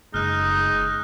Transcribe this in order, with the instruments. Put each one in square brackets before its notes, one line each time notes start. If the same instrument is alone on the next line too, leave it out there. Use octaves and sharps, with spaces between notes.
[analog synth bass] F#1 [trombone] G#3 [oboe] D#4 [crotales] F6 F#6